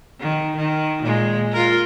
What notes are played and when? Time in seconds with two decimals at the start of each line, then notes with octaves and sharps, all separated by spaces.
0.21 D#3
0.57 D#3
1.03 A#2 G#3
1.52 F4 A#4